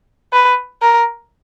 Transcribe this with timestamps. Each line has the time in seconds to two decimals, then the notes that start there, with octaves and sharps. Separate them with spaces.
0.33 B4
0.82 A#4